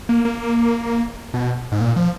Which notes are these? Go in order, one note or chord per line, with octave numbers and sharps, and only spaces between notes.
A#3
A#3
B2
G#2
A#2
F3